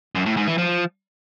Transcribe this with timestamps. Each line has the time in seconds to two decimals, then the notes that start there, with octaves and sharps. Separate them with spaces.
0.15 F#2
0.26 A2
0.37 G#2
0.47 E3
0.58 F3